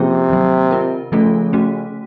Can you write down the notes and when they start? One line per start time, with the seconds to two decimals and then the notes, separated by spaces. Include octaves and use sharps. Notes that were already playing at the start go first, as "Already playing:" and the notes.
Already playing: C3 F3 A#3 C#4 F4 G#4
0.30 D#3 F#3 A#3
0.71 C4 F4 A#4
1.12 C#3 F3 A3 C#4 F4 A4
1.53 A3 C#4 F#4